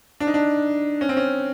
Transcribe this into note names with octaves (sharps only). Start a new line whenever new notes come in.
D4
D#4
D4
C#4
C4
C#4